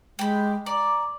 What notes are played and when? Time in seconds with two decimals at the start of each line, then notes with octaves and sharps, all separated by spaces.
0.19 G#3 G4 B5
0.66 D5 A#5